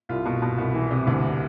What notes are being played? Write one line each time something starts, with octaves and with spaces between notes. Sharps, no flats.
C2 F4
B2
B2
C2
E3
C3
D2